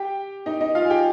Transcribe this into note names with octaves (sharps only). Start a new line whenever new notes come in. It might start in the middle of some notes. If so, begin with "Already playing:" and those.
Already playing: G4 G5
D#4 D#5
D#4 D#5
F4 F5
G#5
G4 G5